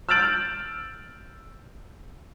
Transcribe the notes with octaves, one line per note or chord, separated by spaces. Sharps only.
E6 F6 G6 A6 D7 F#7